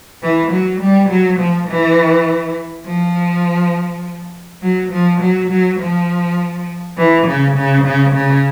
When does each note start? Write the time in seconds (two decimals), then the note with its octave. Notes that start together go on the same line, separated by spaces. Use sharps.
0.22 E3
0.51 F#3
0.81 G3
1.09 F#3
1.40 F3
1.68 E3
2.86 F3
4.62 F#3
4.92 F3
5.21 F#3
5.51 F#3
5.80 F3
6.98 E3
7.27 C#3
7.56 C#3
7.85 C#3
8.15 C#3